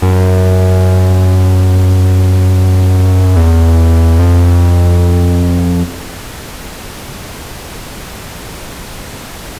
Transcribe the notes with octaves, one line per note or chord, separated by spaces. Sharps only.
F#2
E2
F2